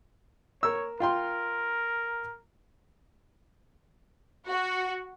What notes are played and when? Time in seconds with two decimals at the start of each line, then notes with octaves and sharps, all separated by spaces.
0.63 A#4 C#5 E6
1.00 F4 A#4 G5 C6
4.48 F#4